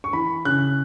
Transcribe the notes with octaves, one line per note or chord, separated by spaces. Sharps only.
C#6
E3 B5
C#3 F#6